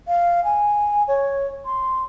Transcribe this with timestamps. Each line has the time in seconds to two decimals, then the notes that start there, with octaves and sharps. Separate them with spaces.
0.08 F5
0.44 G#5
1.08 C#5
1.65 C6